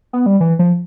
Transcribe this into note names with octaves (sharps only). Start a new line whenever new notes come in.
B3
G3
E3
F3